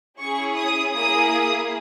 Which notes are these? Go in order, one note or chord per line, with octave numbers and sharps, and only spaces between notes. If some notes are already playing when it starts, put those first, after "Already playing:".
C#4 E4 G#4 C#6
D#6
A#3 E4 G#4 D#6